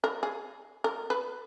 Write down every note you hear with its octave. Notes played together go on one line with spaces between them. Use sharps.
A#4
G#4
A#4
B4